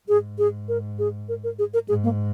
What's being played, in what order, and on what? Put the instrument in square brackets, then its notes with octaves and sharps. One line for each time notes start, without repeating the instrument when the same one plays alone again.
[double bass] G#2 [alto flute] G#4
[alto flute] G#4
A#4
G#4
A#4
A#4
G#4
A#4
[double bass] G#2 [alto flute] G#4
[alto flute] A#3